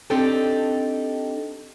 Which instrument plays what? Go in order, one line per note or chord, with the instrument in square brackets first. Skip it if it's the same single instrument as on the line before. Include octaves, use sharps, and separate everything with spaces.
[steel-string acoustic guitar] C4 D4 D#4 G4 A4